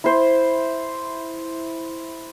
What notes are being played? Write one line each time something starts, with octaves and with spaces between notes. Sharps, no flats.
E4 C5